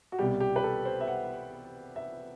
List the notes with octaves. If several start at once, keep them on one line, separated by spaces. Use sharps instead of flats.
F#4
C2 B2 G3 G4
G4
B4
A4
C5
E5
F#5
E5